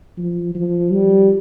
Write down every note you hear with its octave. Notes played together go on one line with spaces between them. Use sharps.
F3
F3
G3